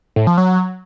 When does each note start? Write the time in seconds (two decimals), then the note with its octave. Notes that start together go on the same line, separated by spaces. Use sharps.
0.16 A2
0.27 F3
0.38 F#3